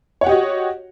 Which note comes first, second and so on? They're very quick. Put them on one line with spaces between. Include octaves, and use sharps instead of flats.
C#5 F#5 G4 D#5 F#4